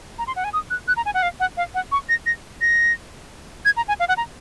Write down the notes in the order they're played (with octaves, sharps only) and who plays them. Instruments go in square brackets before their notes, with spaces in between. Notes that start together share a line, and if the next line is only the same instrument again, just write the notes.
[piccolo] A#5
C6
F#5
G#5
D#6
F#6
F#6
A#5
G#5
F#5
F5
F#5
F5
F#5
C#6
A#6
A#6
A#6
G#6
A#5
G#5
F5
F#5
A#5